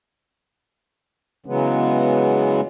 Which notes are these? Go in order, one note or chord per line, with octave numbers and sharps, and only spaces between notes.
C#3 E3 F#3 G#3 B3